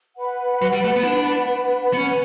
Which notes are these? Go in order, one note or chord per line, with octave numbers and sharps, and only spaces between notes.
B4 F#5 B5
F#3
G3
A3
B3
E4
D4
B3
C#4 B4 F#5 B5